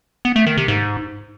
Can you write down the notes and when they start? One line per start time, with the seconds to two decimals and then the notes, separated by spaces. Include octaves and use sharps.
0.25 B3
0.36 A3
0.47 D#3
0.57 C3
0.68 G#2